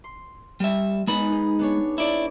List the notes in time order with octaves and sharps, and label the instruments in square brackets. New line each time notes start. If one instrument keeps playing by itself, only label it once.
[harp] C6
[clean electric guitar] G3 E5
[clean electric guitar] G#3 B5 [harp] B3 D#4 B4
[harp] D#4 G#4
B3 D4 C#5
[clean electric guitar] E4 D5